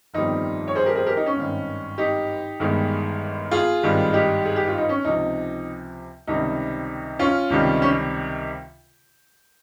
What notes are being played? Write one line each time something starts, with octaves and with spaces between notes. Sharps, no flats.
G1 F2 D#3 G3 D#4
C#5
G#4 C5
G4 A#4
G#4 C5
G4 A#4
D#4
C#4
G#1 G2 D#3
D#4 G4
G1 G2 D#3 G#3
F4 G#4
G#1 G2 D#3 G3
D#4 G4
G#4
G4
F4
D#4
C#4
C#2 C3 F3 D#4
C#2 C3 D#3 G3 D#4
C#4 F4
C#2 C3 D#3 G3
C#4